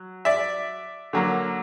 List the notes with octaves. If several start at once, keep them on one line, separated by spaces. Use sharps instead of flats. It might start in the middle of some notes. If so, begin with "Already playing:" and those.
Already playing: F#3
D5 E5
D3 F#3 A#3